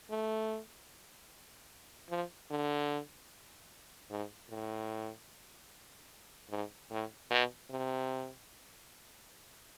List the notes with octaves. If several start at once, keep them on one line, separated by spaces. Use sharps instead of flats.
A3
F3
D3
G#2
A2
G#2
A2
B2
C3